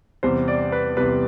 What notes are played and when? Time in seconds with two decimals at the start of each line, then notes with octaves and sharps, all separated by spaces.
0.23 E2 C3 G3 C5
0.48 D5
0.72 B4
0.97 E2 C3 G3 B4